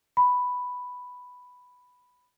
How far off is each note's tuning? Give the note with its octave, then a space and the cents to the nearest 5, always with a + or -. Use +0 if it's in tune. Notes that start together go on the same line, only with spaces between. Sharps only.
B5 +5